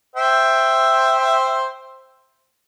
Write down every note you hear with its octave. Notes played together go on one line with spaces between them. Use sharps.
C5 E5 G5